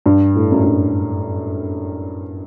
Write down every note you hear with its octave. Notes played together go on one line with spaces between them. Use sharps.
G2
A2
F#2
G2